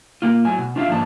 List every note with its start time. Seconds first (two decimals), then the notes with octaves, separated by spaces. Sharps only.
0.22 A#2 A#3 F4
0.45 A2 F#3 G#5
0.58 B2
0.76 D4 F4 E5 F5
0.89 G#2 F3 A#3 D5 G#5 A5